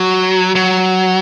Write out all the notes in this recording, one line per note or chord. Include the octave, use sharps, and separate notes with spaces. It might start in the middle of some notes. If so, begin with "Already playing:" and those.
Already playing: F#3
F#3